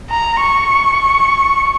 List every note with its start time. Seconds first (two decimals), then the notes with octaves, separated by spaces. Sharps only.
0.10 A#5
0.41 C#6